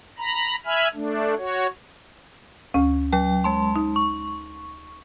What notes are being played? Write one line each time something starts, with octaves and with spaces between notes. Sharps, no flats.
A#5 B5
E5 G#5 B5 F6
A3 D4
F#4 C#5
D2 C#4
F#3 G5
G#3 A5 C6
D#4
C#6